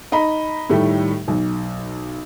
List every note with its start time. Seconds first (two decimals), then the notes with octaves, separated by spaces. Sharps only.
0.12 D#4 D#5 A#5 B5
0.70 A2 D#3 G3 A3
1.28 B1